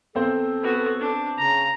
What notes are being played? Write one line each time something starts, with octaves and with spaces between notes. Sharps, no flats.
E2 C4 A4 C5
B3 F#4
D4
C#3 A#5